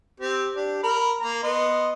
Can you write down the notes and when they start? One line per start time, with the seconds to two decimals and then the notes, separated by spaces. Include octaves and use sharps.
0.20 C4 G4
0.56 D4 G4
0.83 A#4 B5
1.21 A#3 A#5
1.44 B3 D#5 C6